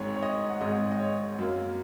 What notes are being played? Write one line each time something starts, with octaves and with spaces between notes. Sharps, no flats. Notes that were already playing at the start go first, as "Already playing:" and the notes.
Already playing: G#1 G#2 G#3 C#5
C#5
D#5
F#5
G#1 G#2 G#3 D#5
D#5
C#5
F#2 F#3 A#3